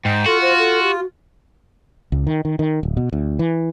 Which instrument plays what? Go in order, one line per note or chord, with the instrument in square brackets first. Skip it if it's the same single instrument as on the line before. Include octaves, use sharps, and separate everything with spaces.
[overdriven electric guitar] G#2 [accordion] G5
[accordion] F4 [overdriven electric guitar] F#4 [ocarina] A4
[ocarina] C5
A4
G4
F#4
[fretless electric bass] C#2
D#3
D#3
D#3
D1
B2
D2
E3